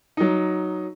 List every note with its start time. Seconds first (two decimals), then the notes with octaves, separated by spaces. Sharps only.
0.17 F#3 D#4